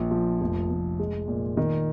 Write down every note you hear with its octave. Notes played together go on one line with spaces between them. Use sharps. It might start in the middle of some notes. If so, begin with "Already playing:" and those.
Already playing: A#1
F3
F1
F1
G#3
A#2
D#3